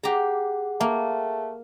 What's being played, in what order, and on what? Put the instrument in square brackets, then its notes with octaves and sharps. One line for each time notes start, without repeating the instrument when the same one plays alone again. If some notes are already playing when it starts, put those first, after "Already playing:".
[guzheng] G4 A#5 [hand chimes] G#4 F#5
[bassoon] A3 [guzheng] A#3